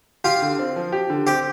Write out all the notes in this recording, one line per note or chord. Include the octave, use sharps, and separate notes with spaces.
F4 G4
D3
C4
F3
G4
D3
C4 G4